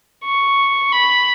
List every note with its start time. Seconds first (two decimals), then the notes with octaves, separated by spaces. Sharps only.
0.25 C#6
0.92 B5